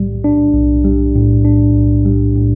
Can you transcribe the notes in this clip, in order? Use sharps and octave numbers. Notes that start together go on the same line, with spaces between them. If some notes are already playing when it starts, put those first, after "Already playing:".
Already playing: B1 A2 G3
D4
B1
G3
A2
D4
B1
G3
A2